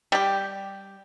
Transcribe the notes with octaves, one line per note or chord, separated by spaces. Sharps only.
G3 G4